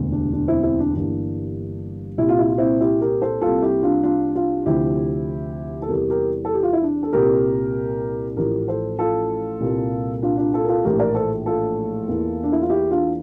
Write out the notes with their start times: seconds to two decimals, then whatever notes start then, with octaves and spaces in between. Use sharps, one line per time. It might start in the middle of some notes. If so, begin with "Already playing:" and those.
Already playing: E1 D2 C3
0.12 D4
0.33 D4
0.48 C4 E4
0.63 C4 E4
0.79 D4
0.94 G1 G2 E3 A#3 D4
2.18 C2 A#2 G3 E4
2.29 F4
2.39 E4
2.48 F4
2.58 C4 E4
2.80 E4 G4
3.01 G4 A#4
3.22 A4 C5
3.41 C2 C3 G3 A#3 F4 A4
3.62 E4 G4
3.83 D4 F4
4.03 D4 F4
4.35 D4 F4
4.66 D2 C3 F3 E4 G4
5.82 A4
5.89 E2 C3 E3 G3 G4 A#4
6.10 G4 A#4
6.45 A4
6.54 G4
6.63 F4
6.73 E4
6.82 D4
7.03 A4
7.13 C2 A#2 G3 G4 A#4
8.37 A1 A2 F3 G4 A#4
8.68 A4 C5
8.99 F4 A4
9.61 C2 A#2 G3 A#3
10.23 D4 F4
10.37 D4 F4
10.53 F4 A4
10.64 A#4
10.68 F4 A4
10.84 A#1 A2 E3 A3 G4 A#4
10.99 A#4 D5
11.15 A4 C5
11.46 F4 A4
12.08 E2 E3 A#3
12.43 D4
12.52 E4
12.61 F4
12.70 E4 G4
12.91 D4 F4